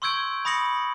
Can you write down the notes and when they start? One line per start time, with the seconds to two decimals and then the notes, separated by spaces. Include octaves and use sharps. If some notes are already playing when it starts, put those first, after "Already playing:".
0.02 C6 C#6 E6 G6 G#6 D7
0.45 B5 D#6 A#6 C#7 F#7